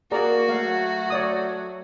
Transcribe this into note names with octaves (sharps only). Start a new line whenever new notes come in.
A#3 F#4 G#4 D5 A#5
F#3 A3 F5
C#5 D5 D#6